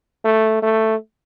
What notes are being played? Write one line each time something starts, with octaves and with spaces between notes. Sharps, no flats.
A3
A3